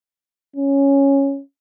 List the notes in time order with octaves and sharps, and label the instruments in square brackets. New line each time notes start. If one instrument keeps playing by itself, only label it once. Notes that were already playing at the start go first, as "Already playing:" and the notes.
[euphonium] C#4